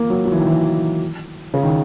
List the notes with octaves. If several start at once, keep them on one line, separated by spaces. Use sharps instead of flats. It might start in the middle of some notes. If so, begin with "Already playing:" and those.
Already playing: A#3
F#3
F#3
E3
D#3
E3
C#3
D#3